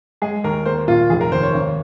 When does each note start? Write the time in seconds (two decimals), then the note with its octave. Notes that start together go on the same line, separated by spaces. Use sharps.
0.22 G#3 G#4
0.44 D#2 A#4
0.66 A#3 C5
0.88 A#2 F4
1.09 F1 G#4
1.21 A#4
1.32 D#2 C5
1.43 C#5
1.54 G#1